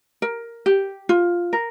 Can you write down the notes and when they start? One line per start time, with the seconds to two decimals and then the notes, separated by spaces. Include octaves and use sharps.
0.22 A#4
0.66 G4
1.09 F4
1.53 A#4